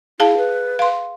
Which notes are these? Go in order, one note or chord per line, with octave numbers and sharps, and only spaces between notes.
E4 G#4 F5 A5
B4
F5 C6